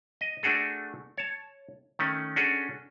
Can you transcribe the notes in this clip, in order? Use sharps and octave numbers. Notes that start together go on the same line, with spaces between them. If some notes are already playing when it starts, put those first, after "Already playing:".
D#5
A3 D4 F#4 G#4 A4
C#5 A5
D#3 A3 C#4
C#4 D4 F#4 G#4 A4